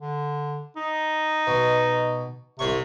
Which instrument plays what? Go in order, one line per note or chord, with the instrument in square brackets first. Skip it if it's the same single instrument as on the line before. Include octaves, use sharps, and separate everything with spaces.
[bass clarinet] D3
D#4
[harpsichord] B2
[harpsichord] C2 C#5 C#6 [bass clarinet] C3